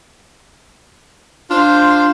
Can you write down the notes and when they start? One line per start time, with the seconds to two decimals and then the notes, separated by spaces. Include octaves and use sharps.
1.50 D4 F4 C5